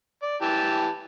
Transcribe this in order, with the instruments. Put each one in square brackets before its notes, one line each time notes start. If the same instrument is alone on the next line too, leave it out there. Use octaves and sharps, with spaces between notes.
[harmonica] D5
E3 G4 A5